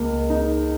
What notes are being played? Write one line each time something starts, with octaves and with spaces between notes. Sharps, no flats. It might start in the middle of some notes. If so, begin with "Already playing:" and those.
Already playing: C#2 A#3
D#4